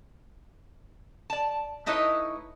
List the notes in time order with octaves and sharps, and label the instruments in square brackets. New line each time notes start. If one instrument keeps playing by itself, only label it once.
[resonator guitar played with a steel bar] D5 A5
A3 D#4 E4 B4 C#5 D#5